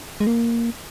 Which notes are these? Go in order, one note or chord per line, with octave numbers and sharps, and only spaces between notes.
G#3
A#3